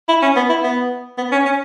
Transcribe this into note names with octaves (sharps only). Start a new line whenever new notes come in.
E4
C#4
B3
E4
B3
B3
C#4
C#4